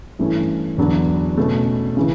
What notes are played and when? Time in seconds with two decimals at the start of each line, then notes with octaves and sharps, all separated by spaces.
0.19 G2 E3 A3 C#4 E4
0.78 E2 D3 F#3 B3 D4
1.37 B2 A3 C#4
1.97 C#3 E3